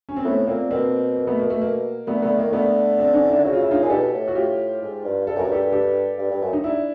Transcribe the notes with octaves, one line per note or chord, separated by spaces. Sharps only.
C#4
C4
A2 A3 B3
A#2 A#3 C4
B2 A#3 C4
A#3
A3 B3
A#3
A3
A#3
D3 A3 B3
D3 A3 B3
D#3 A#3
D3 A3 B3
C4 D4
C#4 D#4
D4 E4
D3
C#3 F#4
F4
E4
D#4 F4
A#2 G#4
B2 G4 A4
A2
F#4
A2 F4 G4
G#2
G2
G2 A4
F#2 A#4
G2
G4 A4
G4 A4
G2
G2
F#2
D#4
D4 E4